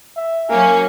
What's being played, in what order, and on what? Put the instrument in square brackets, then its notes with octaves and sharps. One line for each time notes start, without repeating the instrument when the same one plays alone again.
[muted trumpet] E5
[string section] F#3 C#4 [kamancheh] A#3 [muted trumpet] G#5